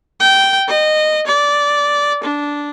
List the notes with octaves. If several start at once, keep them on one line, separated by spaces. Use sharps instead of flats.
G5
D#5
D5
D4